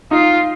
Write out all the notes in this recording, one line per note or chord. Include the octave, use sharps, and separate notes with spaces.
D#4 F4